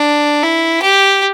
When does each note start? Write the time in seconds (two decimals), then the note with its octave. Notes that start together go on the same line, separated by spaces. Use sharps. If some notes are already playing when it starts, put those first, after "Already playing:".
Already playing: D4
0.43 E4
0.82 G4